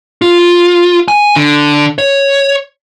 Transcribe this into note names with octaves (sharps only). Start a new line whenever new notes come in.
F4
G#5
D3
C#5